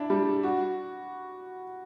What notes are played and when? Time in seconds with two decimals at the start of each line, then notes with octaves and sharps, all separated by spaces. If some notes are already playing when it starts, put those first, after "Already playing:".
Already playing: D4 E4
0.10 G3
0.43 F#4